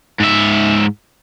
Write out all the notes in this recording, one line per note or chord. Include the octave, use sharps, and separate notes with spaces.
G#2 E5